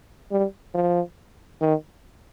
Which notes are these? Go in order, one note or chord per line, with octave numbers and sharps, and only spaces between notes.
G3
F3
D#3